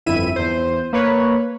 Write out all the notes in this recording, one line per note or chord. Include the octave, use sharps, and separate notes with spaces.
G1 F2 E4 E5 D#7
E2 C5
A#3 B4 C#5